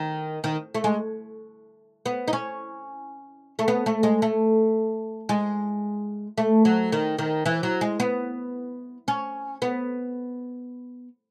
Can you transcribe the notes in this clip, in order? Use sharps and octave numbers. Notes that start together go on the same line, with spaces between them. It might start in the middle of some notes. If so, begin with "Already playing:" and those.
Already playing: D#3
D#3
A3
G#3
B3
D#4
C#4
A3
B3
A3
G#3
A3
G#3
A3
F#3
D#3
D#3
E3
F#3
G#3
B3
C#4
B3